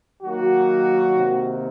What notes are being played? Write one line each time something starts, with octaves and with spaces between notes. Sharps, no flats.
D#3 F#3 A#3 F#4
C3 D#3 A#3